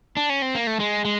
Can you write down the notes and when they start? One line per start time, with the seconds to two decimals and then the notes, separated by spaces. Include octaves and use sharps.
0.17 D4
0.30 C#4
0.42 C4
0.55 A#3
0.67 A3
0.80 G#3
1.05 G#3